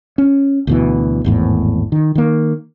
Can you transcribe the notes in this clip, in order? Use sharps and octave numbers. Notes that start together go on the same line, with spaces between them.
C#4
D2 B2 E3
G#1 E2 A2
D#3
D#3 A#3